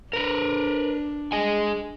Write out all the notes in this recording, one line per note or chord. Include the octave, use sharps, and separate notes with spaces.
D4 A#4 B4
G#4 D#5 G#5